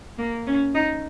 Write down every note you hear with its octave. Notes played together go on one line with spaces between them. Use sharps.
A#3
C#4
D#4